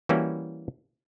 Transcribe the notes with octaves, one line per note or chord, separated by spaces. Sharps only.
E3 G3 A#3 C#4 E4 F#4